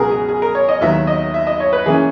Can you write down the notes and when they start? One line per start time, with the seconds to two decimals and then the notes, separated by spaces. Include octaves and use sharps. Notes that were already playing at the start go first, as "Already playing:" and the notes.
Already playing: C#2 B2 F#3 B3 F#4 G#4 A#4
0.11 G#4
0.29 G#4
0.42 A#4
0.55 C#5
0.69 D#5
0.81 D#2 D#3 F#3 B3 E5
1.07 D#5
1.34 E5
1.47 D#5
1.60 C#5
1.73 B4
1.86 E3 A#3 C#4 G#4